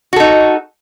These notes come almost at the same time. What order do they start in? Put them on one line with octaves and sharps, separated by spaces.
F#4 A4 D#4